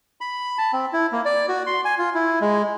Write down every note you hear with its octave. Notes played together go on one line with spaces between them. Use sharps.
B5
A5
C4
E4
A#3
D5
F#4
C6
G#5
F4
E4
G#3